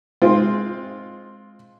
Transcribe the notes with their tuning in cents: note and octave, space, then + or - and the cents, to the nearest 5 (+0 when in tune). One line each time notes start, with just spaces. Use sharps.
G#3 +0 C4 +10 F4 +0